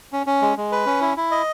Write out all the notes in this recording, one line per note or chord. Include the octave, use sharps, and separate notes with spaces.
C#4
C#4
G#3
G#3
B4
C#4
E4
E4
D#5